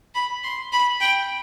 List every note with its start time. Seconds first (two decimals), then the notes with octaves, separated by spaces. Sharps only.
0.15 B5
0.44 C6
0.73 B5
1.01 G5